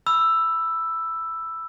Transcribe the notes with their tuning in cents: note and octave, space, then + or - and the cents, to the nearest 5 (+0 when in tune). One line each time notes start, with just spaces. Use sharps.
B5 +0 E6 +5